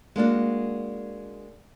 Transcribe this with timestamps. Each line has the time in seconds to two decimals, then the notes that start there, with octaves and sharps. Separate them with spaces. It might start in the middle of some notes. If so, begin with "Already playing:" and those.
0.16 G#3 A#3 D4 F#4